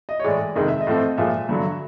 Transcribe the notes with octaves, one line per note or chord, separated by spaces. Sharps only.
D#5
C#5
A2 E3 G#3 D5
F2 C3 D#3 G#3 D#5
E5
D#5
A2 F3 A3 C4
A#2 F3 G#3 E5
G2 D3 F#3